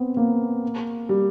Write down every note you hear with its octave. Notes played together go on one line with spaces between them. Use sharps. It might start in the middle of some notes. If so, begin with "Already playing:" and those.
Already playing: B3 C4
A#3
G3